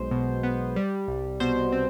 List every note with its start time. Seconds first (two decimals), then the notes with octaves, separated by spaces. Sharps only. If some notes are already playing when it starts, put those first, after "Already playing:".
Already playing: B1 G#3 C5
0.11 B2
0.43 B3
0.76 G3
1.08 C2
1.40 B2 C5
1.72 C4